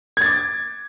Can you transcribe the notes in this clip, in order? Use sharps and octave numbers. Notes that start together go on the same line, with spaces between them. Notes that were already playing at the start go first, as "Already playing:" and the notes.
D6 G#6 A6